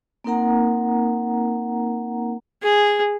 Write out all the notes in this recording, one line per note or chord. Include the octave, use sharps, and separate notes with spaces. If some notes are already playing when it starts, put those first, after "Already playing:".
A#3 C4 D#4 A#4 F#5 A#5
G#4